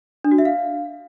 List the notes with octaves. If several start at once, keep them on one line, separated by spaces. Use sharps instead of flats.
D4
F#4
E5
F5